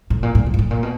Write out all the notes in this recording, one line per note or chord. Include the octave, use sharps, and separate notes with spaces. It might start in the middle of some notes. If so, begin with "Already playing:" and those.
A2
A#2
A2
A2
A#2
A2
A#2
B2